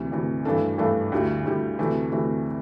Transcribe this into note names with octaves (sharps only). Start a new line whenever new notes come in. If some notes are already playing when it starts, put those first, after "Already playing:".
Already playing: D2 C3 E3
D2 C3 E3
G2 E3 A3 D4 A4
G2 E3 A3 D4 A4
D2 D3 G3 E4 G4
D2 D3 G3 E4 G4
D2 C3 E3 A3
D2 C3 E3 A3